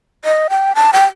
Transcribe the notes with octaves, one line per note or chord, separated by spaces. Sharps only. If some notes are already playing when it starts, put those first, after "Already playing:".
D#5
G5
A5
G5